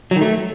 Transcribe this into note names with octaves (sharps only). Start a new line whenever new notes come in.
F#3
D#3
A3